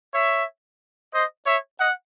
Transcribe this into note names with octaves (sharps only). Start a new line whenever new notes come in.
C#5 E5
C5 D#5
C#5 E5
D#5 F#5